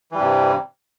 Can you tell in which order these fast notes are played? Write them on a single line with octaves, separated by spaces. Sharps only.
E3 G3 G2 C3